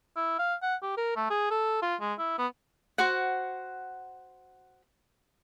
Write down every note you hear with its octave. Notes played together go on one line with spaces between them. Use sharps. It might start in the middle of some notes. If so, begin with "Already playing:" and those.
E4
F5
F#5
G4
A#4
A3
G#4
A4
F4
G#3
E4
B3
F#4 C5 F#5